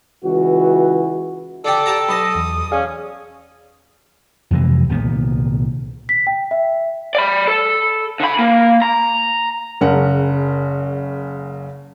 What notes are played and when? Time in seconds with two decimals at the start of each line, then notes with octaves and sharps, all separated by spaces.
0.24 C#2 E3 F#4
1.65 D3 G4 A4 D5
1.86 G4 A5 A#5
2.09 B1 A5 B5 D#6 A#6
2.35 E2
2.72 C#4 G#4 D5 F5
4.51 F2 C3 E3 G#3
4.89 C2 A#2 D#3 B3
6.09 B6
6.27 G5
6.51 E5
7.15 D5 B5
7.47 A4
8.20 D3 B5
8.39 A#3
8.82 A#5
9.81 F#1 C#3 A#4 F#5